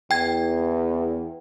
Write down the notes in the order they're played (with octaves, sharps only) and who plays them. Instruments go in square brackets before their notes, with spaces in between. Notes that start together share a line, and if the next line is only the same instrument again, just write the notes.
[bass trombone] E2 [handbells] G5 G#6